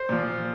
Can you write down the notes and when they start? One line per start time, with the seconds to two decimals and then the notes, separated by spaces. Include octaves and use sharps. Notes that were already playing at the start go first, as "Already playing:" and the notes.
Already playing: C5
0.09 A#2 F3